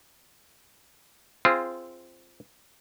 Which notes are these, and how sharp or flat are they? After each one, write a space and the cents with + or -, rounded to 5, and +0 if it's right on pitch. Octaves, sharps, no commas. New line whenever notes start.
C4 +0 F4 -20 G#4 +0